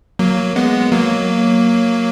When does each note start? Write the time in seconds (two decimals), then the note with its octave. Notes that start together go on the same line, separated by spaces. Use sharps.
0.19 F#3 A#3
0.56 G#3 B3
0.92 F#3 A#3